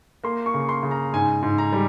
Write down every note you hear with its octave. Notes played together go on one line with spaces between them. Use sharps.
A#3 C6
C#6
C#3
C6
C#3
A#5
G#2 G#5
G#2
A#5
G3